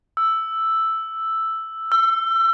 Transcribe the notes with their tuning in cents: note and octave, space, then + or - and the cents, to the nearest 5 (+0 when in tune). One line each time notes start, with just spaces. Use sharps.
E6 +0
E6 +30